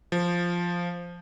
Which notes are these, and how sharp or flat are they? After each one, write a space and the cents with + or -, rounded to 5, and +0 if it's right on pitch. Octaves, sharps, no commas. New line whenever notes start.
F3 +0